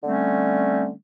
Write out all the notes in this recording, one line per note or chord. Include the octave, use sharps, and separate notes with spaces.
D3 G3 A3 C4 C#4